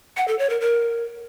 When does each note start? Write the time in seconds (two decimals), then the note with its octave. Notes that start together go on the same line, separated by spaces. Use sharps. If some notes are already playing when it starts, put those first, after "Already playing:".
0.17 F#5
0.28 A4
0.39 C#5
0.50 A#4
0.61 A#4